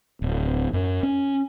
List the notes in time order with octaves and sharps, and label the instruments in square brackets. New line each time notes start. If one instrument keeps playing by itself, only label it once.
[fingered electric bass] D1
F#2
C#4